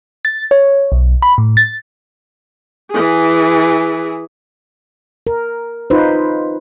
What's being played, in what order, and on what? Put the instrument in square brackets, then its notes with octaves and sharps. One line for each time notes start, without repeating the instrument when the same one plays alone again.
[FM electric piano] A6
C#5
B1
B5
A2
A6
[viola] E3 G#4
[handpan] A#4
D#4 F4 B4 C5